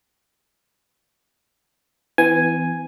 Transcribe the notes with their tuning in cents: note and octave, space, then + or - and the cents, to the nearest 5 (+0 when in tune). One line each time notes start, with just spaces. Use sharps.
E3 +0 B3 +45 G#5 +0